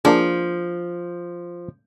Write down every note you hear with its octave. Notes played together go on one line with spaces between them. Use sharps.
F3 A#3 D4 G#4